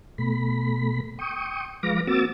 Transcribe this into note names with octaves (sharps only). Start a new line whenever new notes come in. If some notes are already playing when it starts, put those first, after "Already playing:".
B2 A3 B5
G5 C#6 D#6
F3 G#3 B4 F5 D6 A#6
A#3 C4 F#4 D6 E6 A6